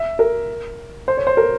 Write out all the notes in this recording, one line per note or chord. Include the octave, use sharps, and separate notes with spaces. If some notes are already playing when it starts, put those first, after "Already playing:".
Already playing: E5
A#4
C5
C#5
C5
A#4